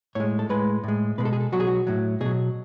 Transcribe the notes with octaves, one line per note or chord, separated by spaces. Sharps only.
A2 G#3 C#5
A4
A2 G#3 B4
A2 G#3
B2 G#3 B4
A4
G#4
A4
B2 F#3 F#4
G#4
F#4
A2 F#3
B2 F#3 G#4